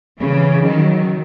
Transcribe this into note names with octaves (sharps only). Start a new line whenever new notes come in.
C#3 E3
D#3 F#3